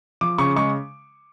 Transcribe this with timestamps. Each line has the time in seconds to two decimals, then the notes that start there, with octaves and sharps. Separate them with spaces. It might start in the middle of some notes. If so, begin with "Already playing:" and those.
0.21 F3 D6
0.38 C#3 C#6
0.56 G#3 C#6